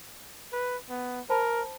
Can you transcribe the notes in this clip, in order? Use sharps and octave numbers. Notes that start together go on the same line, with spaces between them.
B4
B3
A#4 C5 A5 B5